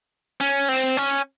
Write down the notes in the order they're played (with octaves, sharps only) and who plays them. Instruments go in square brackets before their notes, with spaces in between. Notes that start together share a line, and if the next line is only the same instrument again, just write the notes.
[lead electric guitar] C#4
C4
C#4